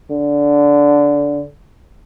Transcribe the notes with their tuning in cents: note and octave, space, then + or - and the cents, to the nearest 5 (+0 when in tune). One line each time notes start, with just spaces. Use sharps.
D3 -15